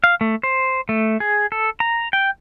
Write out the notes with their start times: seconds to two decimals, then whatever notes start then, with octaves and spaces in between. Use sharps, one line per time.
0.04 F5
0.21 A3
0.43 C5
0.89 A3
1.20 G#4
1.52 A4
1.80 A#5
2.13 G5